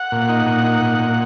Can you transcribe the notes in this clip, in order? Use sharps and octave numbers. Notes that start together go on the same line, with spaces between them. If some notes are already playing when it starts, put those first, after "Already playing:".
Already playing: F#5
A#2
D#4
A#2
D#4
A#2
A#2